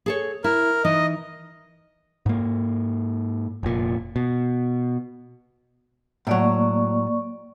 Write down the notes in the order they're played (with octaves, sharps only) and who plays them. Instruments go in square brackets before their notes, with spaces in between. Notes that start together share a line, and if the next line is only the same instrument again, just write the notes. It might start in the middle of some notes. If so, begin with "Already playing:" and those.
[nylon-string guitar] G#4 A4 C#5
[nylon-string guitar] E4 [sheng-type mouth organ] A#4
[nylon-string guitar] E3 D#4 [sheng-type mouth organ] D#5
[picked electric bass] G#2 A#3
F1 A#2
B2
[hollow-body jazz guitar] A2 F#3 [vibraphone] A#3 D5 C#6